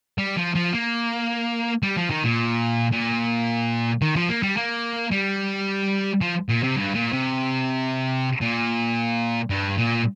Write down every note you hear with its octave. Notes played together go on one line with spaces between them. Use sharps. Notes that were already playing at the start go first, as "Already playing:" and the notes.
G3
F3
F3
A#3
G3
F3
D#3
A#2
A#2
D#3
F3
A#3
G3
A#3
G3
F3
A#2
C3
G2
A#2
C3
A#2
G2
A#2